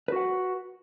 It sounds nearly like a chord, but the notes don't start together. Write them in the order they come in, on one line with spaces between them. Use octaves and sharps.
B4 F#4 F#5